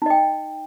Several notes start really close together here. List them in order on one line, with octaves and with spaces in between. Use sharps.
D#4 D#5 G5